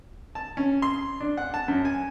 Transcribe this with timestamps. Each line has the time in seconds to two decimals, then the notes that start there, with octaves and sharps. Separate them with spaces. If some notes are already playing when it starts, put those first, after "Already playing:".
0.35 A5
0.57 C#4
0.82 C6
1.20 D4
1.38 F#5
1.54 A5
1.68 F#2
1.85 G#5